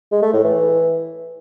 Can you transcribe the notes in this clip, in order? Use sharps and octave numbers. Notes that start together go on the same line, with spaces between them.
G#3
A3
A2
E3